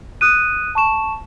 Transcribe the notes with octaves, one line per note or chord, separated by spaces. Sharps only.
D#6 F#6 D#7
A5 C#6 E7